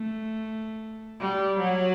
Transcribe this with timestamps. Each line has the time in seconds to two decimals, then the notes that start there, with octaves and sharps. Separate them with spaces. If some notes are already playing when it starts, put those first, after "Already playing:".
Already playing: A3
1.20 G3
1.58 F#3